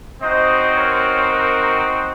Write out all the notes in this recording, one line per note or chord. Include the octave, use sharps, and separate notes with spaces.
C4 D#4 F#4 C5 D#5
A#4 C#5
A#4